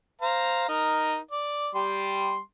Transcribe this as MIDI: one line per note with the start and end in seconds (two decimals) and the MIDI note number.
0.21 0.69 72
0.21 0.69 77
0.21 0.69 82
0.69 1.17 63
0.69 1.17 70
1.31 1.70 74
1.75 2.39 55
1.75 2.39 67
1.75 2.39 84